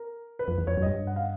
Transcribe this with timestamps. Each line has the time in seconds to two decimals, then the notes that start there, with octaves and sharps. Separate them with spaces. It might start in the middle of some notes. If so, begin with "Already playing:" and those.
Already playing: A#4
0.39 B4
0.48 F2
0.58 E2
0.67 F2 C#5
0.77 F#2
0.82 G2 D#5
1.07 F#5
1.16 F5